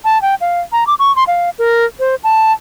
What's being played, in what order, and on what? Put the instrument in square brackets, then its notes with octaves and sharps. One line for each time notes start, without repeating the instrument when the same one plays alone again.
[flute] A5
G5
F5
A#5
D6
C#6
C6
F5
A#4
C5
A5